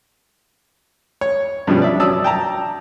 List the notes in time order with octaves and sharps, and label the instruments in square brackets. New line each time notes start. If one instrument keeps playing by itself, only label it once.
[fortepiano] C#5
G2 B2 F3 G3 C#4 D4
D5 E5
F#2 F#3 D5 A5 D#6 E6
G5 A5 A#5